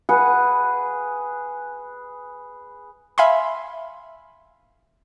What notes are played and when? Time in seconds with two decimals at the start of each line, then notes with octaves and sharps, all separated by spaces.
0.09 G#4 B4 F#5
3.18 E5 F5 G#5 B5 C6